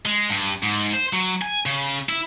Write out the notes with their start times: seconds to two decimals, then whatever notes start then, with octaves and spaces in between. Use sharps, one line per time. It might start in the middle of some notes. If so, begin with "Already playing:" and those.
0.06 G#3
0.30 G2
0.63 G#2
0.93 C5
1.13 F#3
1.42 G#5
1.66 C#3
2.09 E4